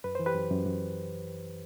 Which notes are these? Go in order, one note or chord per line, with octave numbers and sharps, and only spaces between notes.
F#2 B4
E3 C5
G4 B4
F#2
F#2
F#2